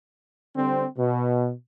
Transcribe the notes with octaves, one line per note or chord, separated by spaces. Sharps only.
D3 G3 C4
B2